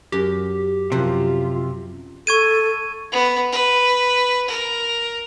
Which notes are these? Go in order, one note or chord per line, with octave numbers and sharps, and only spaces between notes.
F#2 G4 A#4
F#2 C3 F3 F4 F#5
A4 C#6 G#6 D#7
B3
B4
A#4